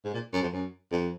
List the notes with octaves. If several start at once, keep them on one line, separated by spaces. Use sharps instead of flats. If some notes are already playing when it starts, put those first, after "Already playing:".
G#2
A#2
F#2
F2
F#2
F2